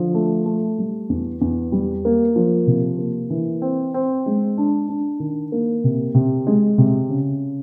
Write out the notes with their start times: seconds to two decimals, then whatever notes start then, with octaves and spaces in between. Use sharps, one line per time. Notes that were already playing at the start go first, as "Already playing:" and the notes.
Already playing: D3 F3
0.14 A3
0.46 A3
0.78 G3
1.10 E2
1.41 E2
1.72 G3
2.05 A#3
2.36 F3
2.67 C3
2.99 A#3
3.30 E3
3.62 C4
3.94 C4
4.26 G#3
4.58 D4
4.88 D4
5.20 D#3
5.52 A#3
5.84 C3
6.15 C3
6.47 G#3
6.78 C3
7.09 C#3